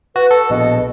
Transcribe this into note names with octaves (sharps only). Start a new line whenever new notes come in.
F#4 B4
A4
A#1 B2 D#5